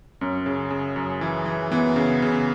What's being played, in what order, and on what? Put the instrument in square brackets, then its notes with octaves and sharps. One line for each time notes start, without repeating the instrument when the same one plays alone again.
[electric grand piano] F#2 [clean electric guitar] C#4
[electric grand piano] C#3
C#3
F#2
E3
E3
[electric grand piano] E3 [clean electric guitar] B3
[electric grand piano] C#3
C#3